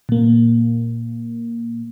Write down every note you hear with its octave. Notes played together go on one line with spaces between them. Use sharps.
A#2 A#3